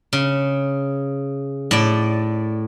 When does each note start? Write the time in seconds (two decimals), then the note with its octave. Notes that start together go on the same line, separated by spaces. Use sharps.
0.13 C#3
1.71 A2 D5